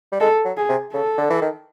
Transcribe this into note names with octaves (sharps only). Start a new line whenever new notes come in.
G3
G#3 A4
F#3
G#4
C3
C#3 A4
D3
E3
D#3